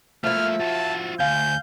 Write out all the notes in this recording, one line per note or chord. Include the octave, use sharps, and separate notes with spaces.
F3 A3 A#3 E4 E5 F6
F4 F#4 A5
D2 F5 G#5 G6